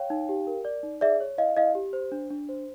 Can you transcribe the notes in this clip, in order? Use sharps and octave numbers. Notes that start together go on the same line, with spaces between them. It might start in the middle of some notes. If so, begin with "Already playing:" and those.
Already playing: C#5 F5 G5
D#4
G4
A#4
D5
D#4
G#4 D5 E5
C#5
E4 D#5 F5
E4 D#5 F5
G4
C5
D4
D4
C5